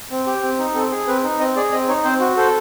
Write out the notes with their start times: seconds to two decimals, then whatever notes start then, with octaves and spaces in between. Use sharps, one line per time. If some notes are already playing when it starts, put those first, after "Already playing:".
0.11 C4
0.27 G4
0.43 C4
0.59 D#4
0.74 C4 A4
0.91 G#4
1.07 C4 B4
1.23 D#4
1.39 C4 D#5
1.56 G#4 D5
1.72 C4 D#5
1.88 D#4 C#5
2.04 C4 C5
2.20 F#4
2.37 A4 C5